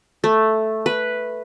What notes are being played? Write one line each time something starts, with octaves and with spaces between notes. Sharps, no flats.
A3
B4